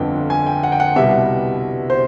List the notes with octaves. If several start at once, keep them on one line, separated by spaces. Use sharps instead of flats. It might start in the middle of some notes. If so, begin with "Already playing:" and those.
Already playing: G1 F2 D3 G5
G#5
G5
F#5
G5
F#5
C2 B2 G3 E5
C5